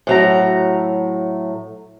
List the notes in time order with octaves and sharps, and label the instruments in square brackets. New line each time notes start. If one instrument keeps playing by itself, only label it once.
[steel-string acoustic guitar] A2 F#3 A#5